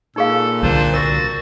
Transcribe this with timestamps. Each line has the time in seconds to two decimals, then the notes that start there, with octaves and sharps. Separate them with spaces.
0.16 A#2 D#4 G#4 A4 F5
0.63 C2 D3 A#3 D4 F4 C5
0.94 F#4 A#4 A6